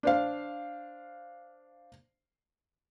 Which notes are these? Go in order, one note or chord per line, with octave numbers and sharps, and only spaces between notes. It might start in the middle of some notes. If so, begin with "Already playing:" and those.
D4 C5 F5